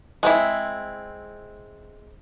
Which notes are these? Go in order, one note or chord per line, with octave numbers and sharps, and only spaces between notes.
G#3 C4 E4